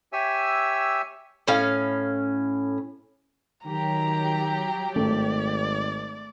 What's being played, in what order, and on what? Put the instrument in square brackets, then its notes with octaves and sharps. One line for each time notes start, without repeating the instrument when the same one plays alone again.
[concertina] G4 C#5 E5 G#5 E6
[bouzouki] A2 C#4 F5
[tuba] D#3 [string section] F#3 G4 [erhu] A#5
[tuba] G#1 [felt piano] A3 [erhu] D5